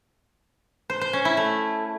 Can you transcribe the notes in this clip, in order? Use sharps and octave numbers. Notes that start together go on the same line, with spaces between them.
C5
C5
C#4
E4
A3